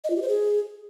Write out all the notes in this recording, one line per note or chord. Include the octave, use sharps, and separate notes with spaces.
D#5
F4
G4
C5
G#4